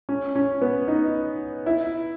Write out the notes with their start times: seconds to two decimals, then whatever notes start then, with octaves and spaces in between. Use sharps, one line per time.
0.09 C#4
0.36 C#4
0.61 B3
0.88 D#4
1.66 E4